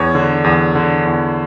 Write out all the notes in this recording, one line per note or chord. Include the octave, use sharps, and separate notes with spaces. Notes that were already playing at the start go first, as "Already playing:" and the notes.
Already playing: E2 C#5
D3
E2
D3
E2